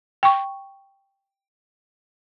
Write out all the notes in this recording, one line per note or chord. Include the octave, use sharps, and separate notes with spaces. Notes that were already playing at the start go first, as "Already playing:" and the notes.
G5 C#6